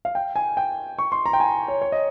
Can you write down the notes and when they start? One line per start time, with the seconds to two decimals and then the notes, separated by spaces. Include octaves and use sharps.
0.05 F5
0.15 G5
0.36 G#5
0.57 G5
0.99 C#6
1.12 C6
1.26 A#5
1.33 G5
1.40 G#5
1.68 C#5
1.82 C#5
1.92 D#5